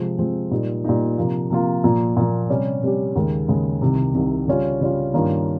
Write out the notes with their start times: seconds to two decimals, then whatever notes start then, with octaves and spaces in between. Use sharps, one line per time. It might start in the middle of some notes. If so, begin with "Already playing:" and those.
Already playing: C3 F3 G#3 C4
0.19 C3 F3 G#3 C4
0.51 A#2 G3 A#3 D#4
0.84 A#2 G3 A#3 D#4
1.18 C3 F3 A#3 F4
1.50 C3 F3 A#3 F4
1.84 A#2 F3 A#3
2.17 A#2 F3 A#3
2.49 C3 G3 C#4 G4
2.83 C3 G3 C#4 G4
3.16 D#2 C#3 G#3
3.48 D#2 C#3 G#3
3.82 C2 C3 D#3
4.15 C2 C3 D#3
4.48 C#3 G3 C#4 F4
4.81 C#3 G3 C#4 F4
5.14 G2 D#3 A#3 C#4 F4